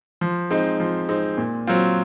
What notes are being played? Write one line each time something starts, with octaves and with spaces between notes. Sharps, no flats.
F3
G#3 C4 D#4
F3
G#3 C4 D#4
A#2
F#3 C4 F4